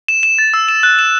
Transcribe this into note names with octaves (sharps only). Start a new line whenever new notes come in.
E7
E7
A6
E6
E7
F#6
E7